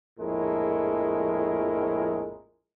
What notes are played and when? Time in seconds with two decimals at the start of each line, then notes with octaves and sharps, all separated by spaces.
0.19 A#1 F2 A2 G#3 A#4